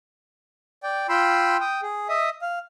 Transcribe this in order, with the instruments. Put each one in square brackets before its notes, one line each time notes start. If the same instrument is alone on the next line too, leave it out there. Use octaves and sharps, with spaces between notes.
[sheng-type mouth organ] D5 G5
F4 G5 B5 C6 E6
G5 D#6
G#4
D#5 E5 D#6
F5